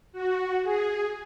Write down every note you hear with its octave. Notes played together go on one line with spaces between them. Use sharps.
F#4
G#4